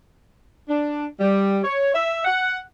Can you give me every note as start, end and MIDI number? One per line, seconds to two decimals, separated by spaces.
0.69 1.05 62
1.20 1.60 55
1.64 1.92 73
1.94 2.22 76
2.25 2.59 78